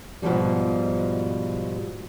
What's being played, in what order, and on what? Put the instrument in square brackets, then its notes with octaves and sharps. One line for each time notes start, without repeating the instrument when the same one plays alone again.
[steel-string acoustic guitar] G#2 B2 E3 F3 G3